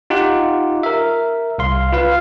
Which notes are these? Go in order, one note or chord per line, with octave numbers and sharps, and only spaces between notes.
D#4 F4 G4 F#5
A#4 E5
C2 F5 C6
F4 B4 F5